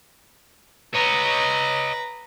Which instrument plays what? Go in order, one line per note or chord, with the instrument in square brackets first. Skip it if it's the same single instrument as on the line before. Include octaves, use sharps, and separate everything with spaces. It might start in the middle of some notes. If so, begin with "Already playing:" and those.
[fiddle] B4 A#5 [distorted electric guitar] C#5 D#5